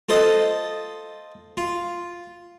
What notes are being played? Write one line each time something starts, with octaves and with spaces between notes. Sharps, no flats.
F4 A4 C5 D#5
F4